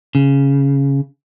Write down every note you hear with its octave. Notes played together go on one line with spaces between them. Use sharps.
C#3